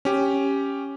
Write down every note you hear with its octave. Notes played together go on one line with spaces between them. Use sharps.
C#4 G4